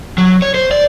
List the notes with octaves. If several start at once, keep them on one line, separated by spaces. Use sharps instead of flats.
F#3
C#5
C5
D5